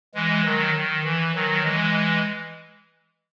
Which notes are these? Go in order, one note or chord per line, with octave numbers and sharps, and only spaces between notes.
E3 G#3
D#3 F#3
D#3
E3
D#3 F#3
E3 G#3